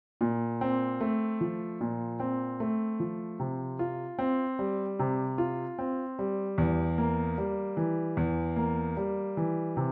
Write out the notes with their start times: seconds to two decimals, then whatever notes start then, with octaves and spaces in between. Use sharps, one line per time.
0.21 A#2
0.61 C4
1.01 A3
1.41 F3
1.81 A#2
2.20 C4
2.60 A3
3.00 F3
3.40 C3
3.79 F4
4.19 C4
4.59 G3
4.99 C3
5.38 F4
5.79 C4
6.19 G3
6.58 E2
6.98 A#3
7.38 G3
7.77 E3
8.17 E2
8.56 A#3
8.97 G3
9.37 E3
9.77 C3